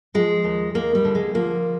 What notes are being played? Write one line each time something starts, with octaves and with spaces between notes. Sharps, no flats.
F3 G#3
D#2
D#2 A#3
G3
D3
G#3
F3 A#3